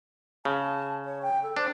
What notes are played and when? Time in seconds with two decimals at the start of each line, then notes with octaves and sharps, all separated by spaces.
0.45 C#3 A5
1.05 C#5
1.22 G5
1.43 A4
1.57 D4 C5